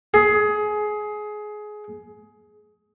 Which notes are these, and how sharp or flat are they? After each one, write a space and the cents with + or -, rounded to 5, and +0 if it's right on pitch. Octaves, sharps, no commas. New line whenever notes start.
G#4 +20